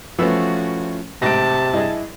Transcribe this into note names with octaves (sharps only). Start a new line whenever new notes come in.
E3 F3 A3 B3 C#4 F#4 E5
A1 G#2 C3 A5 A#6 D7
G2 E4 G#4 D#5